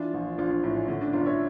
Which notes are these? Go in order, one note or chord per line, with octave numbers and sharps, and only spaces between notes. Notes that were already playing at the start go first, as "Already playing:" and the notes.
Already playing: E3 D4 F4
A#1
A#1 D4 F4
D4
A2 D4
C#4
D3 C#4
D4
G1 D4 F4
C#5 E5